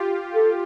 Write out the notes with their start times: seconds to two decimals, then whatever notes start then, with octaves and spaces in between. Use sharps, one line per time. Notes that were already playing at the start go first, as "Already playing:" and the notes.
Already playing: F4 G4
0.35 A4